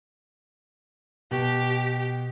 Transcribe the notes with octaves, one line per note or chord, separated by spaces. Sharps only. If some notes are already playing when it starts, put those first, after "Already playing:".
B2 G4